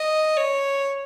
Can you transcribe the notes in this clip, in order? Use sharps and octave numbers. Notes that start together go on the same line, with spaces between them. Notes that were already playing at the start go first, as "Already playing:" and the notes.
Already playing: D#5
C#5